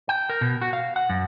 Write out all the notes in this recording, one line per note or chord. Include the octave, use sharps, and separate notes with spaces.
G5
A#4
B2
F#4
F5
F#5
F#2